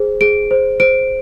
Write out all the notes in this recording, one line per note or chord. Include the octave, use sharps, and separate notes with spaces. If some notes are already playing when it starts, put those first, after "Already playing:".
Already playing: G#4 C5
G#4 D7
C5
C5 D7